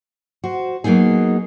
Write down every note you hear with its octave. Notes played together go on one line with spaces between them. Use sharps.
F#4 C5
F#3 A#3 B3 D#4 G#4